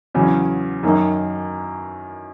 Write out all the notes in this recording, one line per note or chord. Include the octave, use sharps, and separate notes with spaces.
E2 C#3 F#3 C#4
F#2 D#3 A#3 D#4